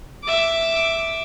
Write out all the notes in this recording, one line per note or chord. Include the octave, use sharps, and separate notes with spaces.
E5 D6